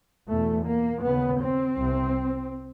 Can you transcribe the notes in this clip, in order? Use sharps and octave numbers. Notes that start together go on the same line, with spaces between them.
E2 B2 A3
A#3
D#2 C#3 B3
C4
C2 C3